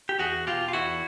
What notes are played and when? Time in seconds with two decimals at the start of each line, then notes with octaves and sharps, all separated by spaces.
0.09 G4
0.19 E2 F#4 G#4
0.46 B2 F4 G4
0.68 F4
0.73 E2 E4 F#4